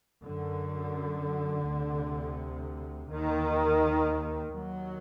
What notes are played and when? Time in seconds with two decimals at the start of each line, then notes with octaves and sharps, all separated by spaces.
0.24 F#2 D3
1.67 D2 C3
3.10 D#2 D#3
4.54 D#2 F#3